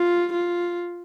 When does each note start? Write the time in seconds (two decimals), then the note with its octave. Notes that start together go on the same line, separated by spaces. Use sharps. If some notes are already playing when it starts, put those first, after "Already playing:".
Already playing: F4
0.33 F4